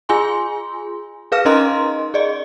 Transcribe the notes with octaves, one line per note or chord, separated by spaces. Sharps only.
F4 G#4 G#5 C6
G#4 B4 F5 F6
C#4 D#4 A#4 D#5 A#5 C6
G#4 D5 D#5